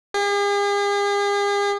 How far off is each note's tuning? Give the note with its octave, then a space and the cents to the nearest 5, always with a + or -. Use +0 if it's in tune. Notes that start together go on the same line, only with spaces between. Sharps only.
G#4 -45